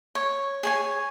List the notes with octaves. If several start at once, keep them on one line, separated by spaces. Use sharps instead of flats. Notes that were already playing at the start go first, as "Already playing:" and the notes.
C#5
G#4 C#5 G#5